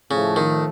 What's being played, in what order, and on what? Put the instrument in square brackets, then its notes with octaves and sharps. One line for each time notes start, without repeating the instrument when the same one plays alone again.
[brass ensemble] A2 F3 A3 [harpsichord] C#3
[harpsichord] D#3